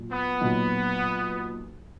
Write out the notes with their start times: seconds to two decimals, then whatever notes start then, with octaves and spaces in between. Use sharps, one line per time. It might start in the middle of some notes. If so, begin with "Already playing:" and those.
Already playing: A#2 F#3 A#3
0.13 B3
0.41 B1 A#2 F#3